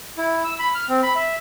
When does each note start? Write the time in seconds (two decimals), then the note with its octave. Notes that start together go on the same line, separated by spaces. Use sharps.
0.17 E4
0.44 E6
0.59 B5
0.75 F6
0.89 C4
1.03 B5
1.15 E5